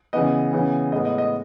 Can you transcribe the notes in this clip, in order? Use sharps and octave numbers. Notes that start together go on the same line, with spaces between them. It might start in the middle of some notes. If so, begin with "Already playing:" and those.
C#3 E3 B3 D#5
C#3 E3 B3
A2 G#3 B3 D#5
D#5
D#5